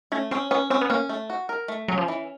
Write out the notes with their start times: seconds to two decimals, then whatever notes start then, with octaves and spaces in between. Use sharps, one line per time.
0.12 A3 C#4
0.31 C4 C#4
0.51 B3 C#4
0.70 C4 C#4
0.81 B3
0.90 A#3 C#4
1.09 A3
1.30 F#4
1.49 A#4
1.68 A3
1.88 F#3 C#4
1.98 F3
2.08 E3